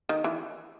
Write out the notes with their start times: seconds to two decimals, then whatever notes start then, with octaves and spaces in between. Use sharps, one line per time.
0.09 D#3
0.24 E3